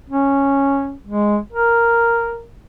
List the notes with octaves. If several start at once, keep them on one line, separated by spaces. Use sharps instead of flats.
C#4
G#3
A#4